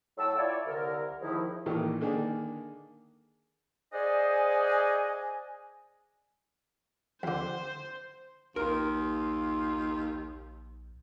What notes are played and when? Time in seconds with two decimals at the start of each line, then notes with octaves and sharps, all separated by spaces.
0.17 A2 F#3 G5 A5 E6
0.37 E4 F4 C#5 D5
0.66 C2 D3 A#4
1.21 D#2 G#2 D#3 F3 D#4 E4
1.66 A1 A#2 D#3 A4
2.01 D3 D#3 A#3 D4 G#4
3.93 G#4 C5 D5 D#5 F#5 G#5
7.23 F2 D3 C5
8.56 A#1 D#2 F4 A#4